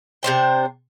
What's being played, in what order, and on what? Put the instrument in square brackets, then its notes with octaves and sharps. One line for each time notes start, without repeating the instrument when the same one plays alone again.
[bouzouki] C3 D4 C5 G5